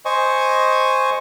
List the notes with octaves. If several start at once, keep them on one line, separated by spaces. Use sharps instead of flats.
C5 D#5 G#5 C#6